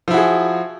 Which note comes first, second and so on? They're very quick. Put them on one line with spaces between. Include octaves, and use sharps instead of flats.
F3 E4 F#4 G#4